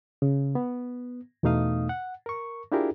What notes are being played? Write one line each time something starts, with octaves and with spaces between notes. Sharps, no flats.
C#3
B3
E2 B2 A3 D#4 F5 D#6
F#5
A#4 C#6
D4 E4 F4 G4 G#4 A#4